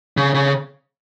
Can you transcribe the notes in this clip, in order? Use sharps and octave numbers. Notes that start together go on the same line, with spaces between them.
C#3
C#3